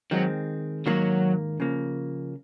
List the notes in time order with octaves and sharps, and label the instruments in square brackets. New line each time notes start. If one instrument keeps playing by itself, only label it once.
[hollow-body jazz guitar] D#3 G#3 C4 [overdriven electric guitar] F#3
[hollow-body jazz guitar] G#2 D#3 A#3 [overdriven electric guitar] F#3
[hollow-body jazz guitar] C#3 F3 A#3